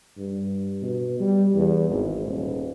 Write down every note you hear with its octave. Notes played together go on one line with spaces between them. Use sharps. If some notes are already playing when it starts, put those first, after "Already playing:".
G2
B2
G3
E2
G#1
D#1